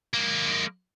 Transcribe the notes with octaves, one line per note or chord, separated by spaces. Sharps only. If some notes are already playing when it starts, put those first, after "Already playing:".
G#3 A#3